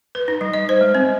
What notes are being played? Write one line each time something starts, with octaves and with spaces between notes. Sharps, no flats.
B4
D#4
G3
D#5
C5
G#3
C4